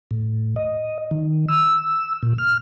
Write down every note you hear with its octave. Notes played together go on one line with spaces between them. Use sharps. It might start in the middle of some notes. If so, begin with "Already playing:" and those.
A2
D#5
D#3
E6
A#2
F6